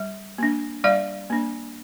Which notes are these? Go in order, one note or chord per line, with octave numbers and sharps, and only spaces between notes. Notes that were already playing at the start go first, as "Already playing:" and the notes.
Already playing: G3
A#3 D4
G3 D5 F5
A#3 D4